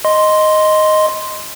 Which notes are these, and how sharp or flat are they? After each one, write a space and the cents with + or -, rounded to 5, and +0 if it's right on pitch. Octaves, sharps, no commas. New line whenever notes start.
D#5 +0 C6 +0